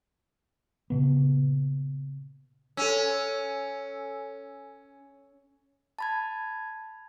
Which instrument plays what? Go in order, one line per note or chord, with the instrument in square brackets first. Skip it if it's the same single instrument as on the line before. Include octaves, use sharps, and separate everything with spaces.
[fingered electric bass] A#2 C#3 B3
[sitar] C#4 [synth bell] A4 G#5 E6
[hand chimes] A5 B5 G#6